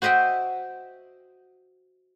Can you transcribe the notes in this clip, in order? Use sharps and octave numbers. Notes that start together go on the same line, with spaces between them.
F#4 C5 D#5 E5 G5